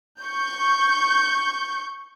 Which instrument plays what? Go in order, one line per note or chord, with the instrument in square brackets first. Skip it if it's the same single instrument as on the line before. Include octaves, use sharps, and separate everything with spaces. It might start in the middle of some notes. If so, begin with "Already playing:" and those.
[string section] C#6 G6